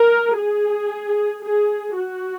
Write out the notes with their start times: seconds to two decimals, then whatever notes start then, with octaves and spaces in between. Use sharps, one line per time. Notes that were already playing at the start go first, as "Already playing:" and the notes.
Already playing: A#4
0.36 G#4
1.44 G#4
1.96 F#4